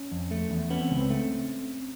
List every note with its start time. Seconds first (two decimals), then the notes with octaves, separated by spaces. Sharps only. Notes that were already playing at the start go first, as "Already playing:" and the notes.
Already playing: C#4
0.12 F2
0.31 A3
0.51 E2
0.70 B3 C#4
0.81 C4
0.90 C#2
1.00 C4
1.10 A3